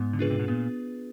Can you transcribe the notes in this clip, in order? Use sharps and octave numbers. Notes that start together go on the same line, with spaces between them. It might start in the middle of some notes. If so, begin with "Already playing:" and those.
Already playing: G#2 B3
D3
C#3 D4 F4 G#4 B4
C3
B2
A#2 B3